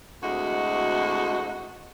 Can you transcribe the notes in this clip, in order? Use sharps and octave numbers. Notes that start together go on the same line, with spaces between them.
D2 C3 G#3 E4 F#4 D#5